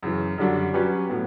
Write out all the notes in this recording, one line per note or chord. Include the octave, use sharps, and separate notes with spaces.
F#2 C#3 E3
F#2 D3 G3 D4 F#4
F#3 C#4 G4 B4
A2 F#3 B3